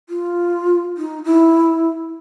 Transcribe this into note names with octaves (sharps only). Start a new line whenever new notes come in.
F4
D#4
E4